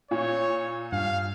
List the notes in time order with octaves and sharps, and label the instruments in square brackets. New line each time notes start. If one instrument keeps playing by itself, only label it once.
[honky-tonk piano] A#2 [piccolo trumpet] C#5
[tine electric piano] G2 [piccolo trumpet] F5